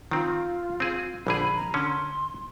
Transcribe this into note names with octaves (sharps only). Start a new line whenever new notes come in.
D#3 C4 F4
C4 G#4
A#1 D3 G#4 B5
A#5
D3 C#4 C6